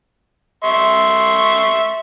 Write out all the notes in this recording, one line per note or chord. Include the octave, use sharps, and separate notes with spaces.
E5 C6 C#6